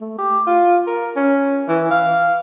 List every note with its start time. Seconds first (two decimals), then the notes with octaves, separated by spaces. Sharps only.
0.01 A3
0.19 G4
0.47 F4
0.87 A#4
1.16 C#4
1.68 E3
1.91 F5